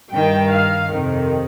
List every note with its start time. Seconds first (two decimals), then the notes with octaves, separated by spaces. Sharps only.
0.11 G2 D#3 G5
0.51 F5
0.90 F2 C3 D#3